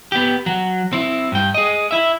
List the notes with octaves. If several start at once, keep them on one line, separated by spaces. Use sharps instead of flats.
B3 G4
F#3
C4 E4
G2 G5
G#4 D#5
E4 E5